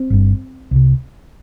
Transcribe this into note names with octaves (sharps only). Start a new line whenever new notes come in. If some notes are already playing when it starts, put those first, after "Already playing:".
Already playing: C4
G1 G2
C2 C3